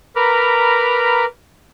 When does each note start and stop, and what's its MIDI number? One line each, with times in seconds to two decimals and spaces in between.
0.16 1.25 70
0.16 1.25 71
0.16 1.25 82
0.16 1.25 83
0.16 1.25 86
0.16 1.25 89